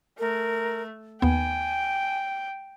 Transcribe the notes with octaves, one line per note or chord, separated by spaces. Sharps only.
A3 A#4
D#2 B3 G5 G#5